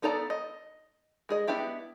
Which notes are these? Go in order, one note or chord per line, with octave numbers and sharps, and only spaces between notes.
B3 D#4 A4 D5 A#5
D#5
G#3 G#4 D#5
B3 D4 E4 G4 E5